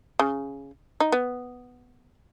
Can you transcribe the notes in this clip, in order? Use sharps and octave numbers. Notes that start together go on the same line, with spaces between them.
C#3
D#4
B3